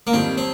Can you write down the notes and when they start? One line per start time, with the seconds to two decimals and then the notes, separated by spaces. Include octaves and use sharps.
0.07 A#3
0.13 F2 D#3 G3 C4
0.37 C4